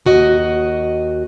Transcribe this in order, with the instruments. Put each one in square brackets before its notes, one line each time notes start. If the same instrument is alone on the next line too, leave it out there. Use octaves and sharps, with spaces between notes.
[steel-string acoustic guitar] D#2 F#4 D#5